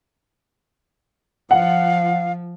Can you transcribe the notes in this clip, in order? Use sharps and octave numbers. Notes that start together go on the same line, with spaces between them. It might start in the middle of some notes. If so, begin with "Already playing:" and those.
F3 F5 F#5